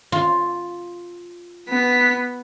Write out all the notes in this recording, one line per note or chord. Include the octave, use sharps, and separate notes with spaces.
F4
B3 B6